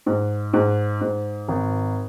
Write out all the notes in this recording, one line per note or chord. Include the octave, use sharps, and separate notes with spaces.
G#2
G#2
G#2
G#1